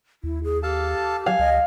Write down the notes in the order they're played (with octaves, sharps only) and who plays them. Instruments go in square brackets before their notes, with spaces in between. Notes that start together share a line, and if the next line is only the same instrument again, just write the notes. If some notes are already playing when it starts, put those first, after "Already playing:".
[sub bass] D#2 [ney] E4
[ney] G#4
[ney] G4 [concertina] A4 F5 A5
[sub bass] F#3 [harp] F5 [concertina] G#5
[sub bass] C#2 [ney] D#5